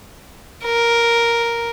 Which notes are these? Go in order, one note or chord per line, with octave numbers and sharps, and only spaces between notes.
A#4